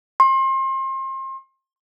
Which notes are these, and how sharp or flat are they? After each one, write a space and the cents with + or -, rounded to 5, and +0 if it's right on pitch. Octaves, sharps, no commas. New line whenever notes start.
C6 +35